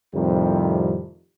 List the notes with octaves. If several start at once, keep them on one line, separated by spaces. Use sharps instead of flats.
F2 A2 C3 D#3 G3